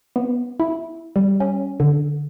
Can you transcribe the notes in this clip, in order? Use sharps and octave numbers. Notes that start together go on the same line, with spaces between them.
B3
E4
G3
C#4
D3